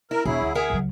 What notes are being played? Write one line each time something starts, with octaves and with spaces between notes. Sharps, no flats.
E4 A#4
E1 F#3 E4 G#4
D2
G#4 A#4 E5 F#5
C#2 F#3